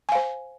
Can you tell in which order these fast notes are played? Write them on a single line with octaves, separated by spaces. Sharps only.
G#5 F5 C5